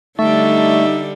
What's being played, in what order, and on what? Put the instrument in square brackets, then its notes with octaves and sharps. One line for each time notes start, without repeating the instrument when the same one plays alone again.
[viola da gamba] D3 G3 [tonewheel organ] A3 [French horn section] D#4 [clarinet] E5